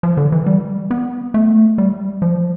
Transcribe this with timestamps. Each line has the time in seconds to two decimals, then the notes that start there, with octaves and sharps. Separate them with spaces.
0.03 F3
0.17 D3
0.32 E3
0.46 G3
0.91 B3
1.34 A3
1.78 G3
2.22 F3